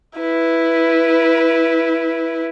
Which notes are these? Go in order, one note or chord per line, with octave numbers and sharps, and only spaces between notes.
E4 B4